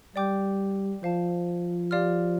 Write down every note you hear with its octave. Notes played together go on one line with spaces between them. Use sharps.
G3 D5 G5 D6 G6
F3 C5 F5 A5
G4 D5 F5 C6 F6